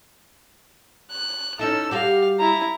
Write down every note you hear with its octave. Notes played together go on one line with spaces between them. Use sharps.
F#6
C#4 D#4 E4 A4 E6
G3 F#4 G4 F5
E4 A#5